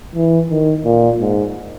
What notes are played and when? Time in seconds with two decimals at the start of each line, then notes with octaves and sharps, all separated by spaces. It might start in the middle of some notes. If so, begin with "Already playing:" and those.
0.15 E3
0.50 D#3
0.85 A#2
1.20 G#2